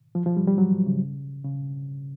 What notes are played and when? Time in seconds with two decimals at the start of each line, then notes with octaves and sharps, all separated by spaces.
0.15 F3
0.26 F3
0.37 G3
0.47 G3
0.58 F#3
0.72 F3
0.87 C#3
1.44 C#3